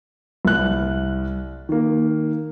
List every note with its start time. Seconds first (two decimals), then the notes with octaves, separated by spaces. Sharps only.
0.45 C2 F#6
1.69 D#3 A#3